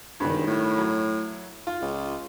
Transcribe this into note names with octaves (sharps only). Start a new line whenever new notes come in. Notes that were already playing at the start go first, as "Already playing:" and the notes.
E1 G2 D#3
A2
F#3
F4
C#2